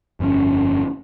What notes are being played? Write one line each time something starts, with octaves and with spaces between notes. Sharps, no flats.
G1 F2 B2 C#4